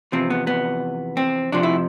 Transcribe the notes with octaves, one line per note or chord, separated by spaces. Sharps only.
E2 C3 F3 C4
B3
B3
C4
F2 C3 F3 D4
E4